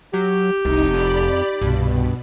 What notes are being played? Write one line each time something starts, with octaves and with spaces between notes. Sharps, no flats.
F#3 G4
F1 C2 D#4
F2 D5 B5
C2 G2 B2